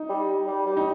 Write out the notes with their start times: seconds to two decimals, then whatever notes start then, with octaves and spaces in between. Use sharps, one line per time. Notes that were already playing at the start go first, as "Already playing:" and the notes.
Already playing: D#4
0.10 G3
0.47 G3
0.66 G3
0.77 D#4